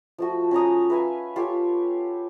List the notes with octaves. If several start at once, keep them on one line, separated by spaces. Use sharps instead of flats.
F3 A3 F#4
C#4 C#5 A#5 D#6
B4 E5 F5 G#5
F4 G4 A4 C#5